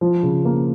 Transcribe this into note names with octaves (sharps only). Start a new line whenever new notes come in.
F3
C#3
A#3